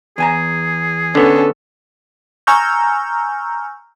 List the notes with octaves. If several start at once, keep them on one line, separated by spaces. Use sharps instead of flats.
E2 G#4 G#5 A#5
D3 B3 C#4 A4
G#5 A#5 C#6 E6 F6 G6